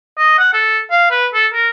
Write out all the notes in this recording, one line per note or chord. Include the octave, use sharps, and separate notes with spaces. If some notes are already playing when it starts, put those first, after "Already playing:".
D#5
F#5
A4
F5
B4
A4
A#4